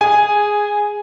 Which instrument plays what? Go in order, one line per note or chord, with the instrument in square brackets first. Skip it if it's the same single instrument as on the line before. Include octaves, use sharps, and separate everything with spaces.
[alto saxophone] G#4 [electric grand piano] G#5